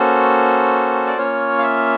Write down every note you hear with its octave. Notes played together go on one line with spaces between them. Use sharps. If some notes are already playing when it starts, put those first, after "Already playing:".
Already playing: A#3 C#4 F#4 A4 C5
D5
A#3 C#4 F4 C#5
F5
E5